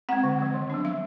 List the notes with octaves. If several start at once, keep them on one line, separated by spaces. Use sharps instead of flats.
G#3 C4 F#5
D3
F3 G#3
D#3
F#3 B3 D4
G3 E5